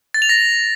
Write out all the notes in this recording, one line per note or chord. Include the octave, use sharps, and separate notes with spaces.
A6
F7
A#6